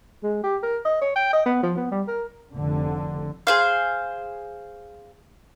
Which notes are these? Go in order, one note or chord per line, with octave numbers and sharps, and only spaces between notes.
G#3
G4
A#4
D#5
C#5
G5
D#5
B3
F3
B3
G3
A#4
F1 D3
G#4 C5 F5